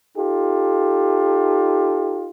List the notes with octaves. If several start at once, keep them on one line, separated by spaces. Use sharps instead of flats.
D#4 F4 G4 A4